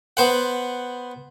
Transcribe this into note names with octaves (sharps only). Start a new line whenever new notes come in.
B3 C5 F#5